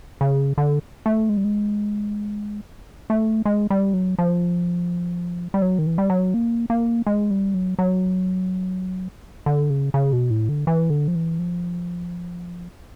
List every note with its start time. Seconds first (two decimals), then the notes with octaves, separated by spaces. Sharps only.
0.21 C#3
0.58 D3
1.06 A3
1.29 G#3
1.37 G3
1.44 G#3
3.10 A3
3.46 G#3
3.70 G3
3.94 F#3
4.19 F3
5.54 G3
5.62 F#3
5.79 D#3
5.87 E3
5.98 G3
6.10 F#3
6.34 A#3
6.70 A#3
7.07 G#3
7.31 G3
7.54 F#3
7.79 F#3
9.46 D3
9.70 C#3
9.94 C#3
10.13 B2
10.30 A2
10.49 D3
10.67 E3
10.90 D3
11.08 F3
11.15 E3
11.39 F3